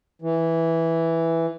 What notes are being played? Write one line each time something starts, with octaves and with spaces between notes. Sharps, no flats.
E3